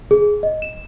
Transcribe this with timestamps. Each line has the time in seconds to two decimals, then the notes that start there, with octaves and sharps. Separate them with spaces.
0.11 G#4
0.43 D#5
0.62 E7